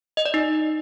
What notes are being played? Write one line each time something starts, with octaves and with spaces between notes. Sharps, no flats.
D#5
D5
D#4